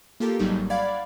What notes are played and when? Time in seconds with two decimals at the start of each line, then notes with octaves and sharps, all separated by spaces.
0.20 A#3 F4 G4 A4 A#4
0.39 G#1 F#3 G3 D#4
0.70 D5 F5 F#5 B5 G#6